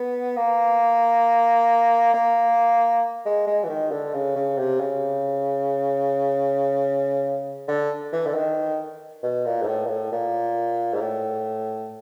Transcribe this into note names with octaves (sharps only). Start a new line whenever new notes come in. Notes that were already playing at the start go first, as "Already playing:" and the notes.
Already playing: B3
A#3
A#3
G#3
G#3
E3
D#3
D3
C#3
C#3
C3
C#3
D3
E3
D3
D#3
B2
A#2
G#2
A2
A#2
A2
A#2
G#2
A2